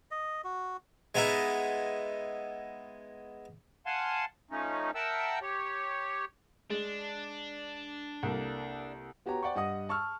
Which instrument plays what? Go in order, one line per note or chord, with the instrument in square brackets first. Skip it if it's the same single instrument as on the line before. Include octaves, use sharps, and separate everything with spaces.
[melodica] D#5
F#4
[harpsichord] G#3 B3 D#4 E4
[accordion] F5 F#5 G#5 A5 C6
F3 A3 C#4 D#4
A#4 E5 F#5 G5 A5 E6
G4 C#5
[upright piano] G#3 [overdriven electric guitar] D4
[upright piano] C2 A#3 A4
[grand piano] B3 F#4 G4 C#5 A#5
C5 D5 F#5 G5 C#6
G2 D#5 F#5 D#6
A5 C#6 E6 F6